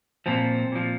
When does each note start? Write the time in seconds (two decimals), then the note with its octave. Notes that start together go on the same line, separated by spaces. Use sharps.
0.26 A#2 F3 C4
0.72 A#2 F3